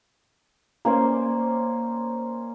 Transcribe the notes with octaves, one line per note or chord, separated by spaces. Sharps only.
A#3 C#4 C5 D5